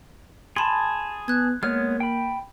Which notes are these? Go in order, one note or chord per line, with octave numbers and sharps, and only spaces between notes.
G#4 A5 B5 C6
B3 F#6 G#6
G#3 A#3 B3 C#5 F6
G5 B5